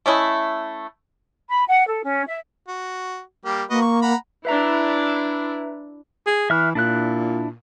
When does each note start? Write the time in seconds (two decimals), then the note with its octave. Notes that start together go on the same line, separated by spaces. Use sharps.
0.06 A3 C#4 E4 D#5
1.49 B5
1.66 F#5
1.86 A4
2.03 C#4
2.28 E5
2.68 F#4
3.45 G3 A#3 G4
3.70 A#3 F#4 B4 D#5
3.82 C#6
4.02 F#5 A#5 B5
4.45 D4 E4 B4 E5 A#5
6.27 G#4
6.50 E3 E5 F6 F#6
6.75 A#2 D4 E4 F#6